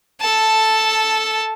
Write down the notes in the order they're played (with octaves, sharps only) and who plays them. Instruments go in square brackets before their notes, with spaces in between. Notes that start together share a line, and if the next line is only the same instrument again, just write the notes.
[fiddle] A4 A5